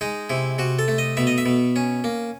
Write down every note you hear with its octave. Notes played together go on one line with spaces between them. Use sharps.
G#3 D#4
C3 E4
C3 F#4
A4
A3
D#5
B2 E5
D#5
E5
B2
C#4
A#3